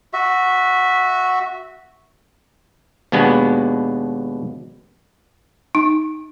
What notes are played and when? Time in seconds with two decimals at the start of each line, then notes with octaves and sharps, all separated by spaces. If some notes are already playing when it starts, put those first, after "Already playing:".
0.13 F#4 E5
3.12 D#2 B2 G#3 B3 D4
5.75 D#4